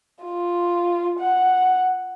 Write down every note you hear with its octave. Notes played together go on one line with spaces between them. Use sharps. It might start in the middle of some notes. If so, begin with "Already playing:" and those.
F4
F#5